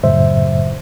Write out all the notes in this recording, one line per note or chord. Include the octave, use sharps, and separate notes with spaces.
F#2 A2 C#3 F#3 C5 E5